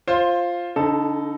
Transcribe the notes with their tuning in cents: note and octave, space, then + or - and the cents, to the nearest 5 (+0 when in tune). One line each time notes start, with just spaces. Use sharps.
F4 +0 C5 +15
D3 -40 D#4 +0 A4 +0